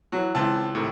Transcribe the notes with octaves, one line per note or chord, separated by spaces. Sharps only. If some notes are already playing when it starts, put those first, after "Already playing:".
E3 F#3
C#2 E3 C4 A5 E6
A2 C3 D#3